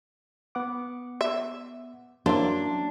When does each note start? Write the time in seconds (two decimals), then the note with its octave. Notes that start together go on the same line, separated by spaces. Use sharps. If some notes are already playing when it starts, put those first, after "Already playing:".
0.55 B3 F#5 D6
1.21 E5
2.26 F#3 A#3 C#4 D4 E4 C5